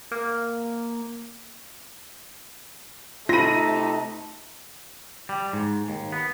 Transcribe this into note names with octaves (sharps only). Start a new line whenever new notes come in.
A#3
C3 A3 D#4 F4 B5 A#6 D#7
G3
G#2
D#2
B3